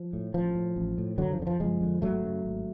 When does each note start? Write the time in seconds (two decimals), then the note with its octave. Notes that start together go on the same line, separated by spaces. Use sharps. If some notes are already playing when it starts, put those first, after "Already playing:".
Already playing: F3
0.13 A2
0.34 A1 F3
0.55 A2
0.76 A1
0.98 A2
1.18 F#1 D3 F#3
1.32 F3
1.39 F2 D3
1.47 F3
1.60 F#1 F3 G#3
1.81 F2 D3
2.02 G#1 F#3 A3
2.23 F#2 C#3
2.45 G#1